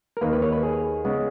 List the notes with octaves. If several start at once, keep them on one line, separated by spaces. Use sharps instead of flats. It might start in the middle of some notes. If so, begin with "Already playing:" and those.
A#4
D#2 D#3 A#3 B4
B4
C#5
B4
G#4
C#3 G#3 B3